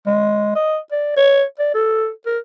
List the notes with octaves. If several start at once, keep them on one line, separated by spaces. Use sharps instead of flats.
G#3
D#5
D5
C#5
D5
A4
A#4